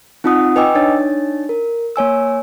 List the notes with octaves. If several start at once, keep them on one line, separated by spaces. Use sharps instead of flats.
C4 D#4 F4 F#5 D#6
B4 D#5 G5 G#5 D6 E6
D4 D#4 C#5 A6
A#4
A#3 C#5 G#5 E6